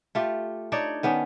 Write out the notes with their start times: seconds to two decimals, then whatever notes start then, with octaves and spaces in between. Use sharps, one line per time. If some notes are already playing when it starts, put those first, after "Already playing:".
0.15 A3 F4 G4
0.72 D4 D#4 C#5 D5
1.03 D#3 B3 C#4 D4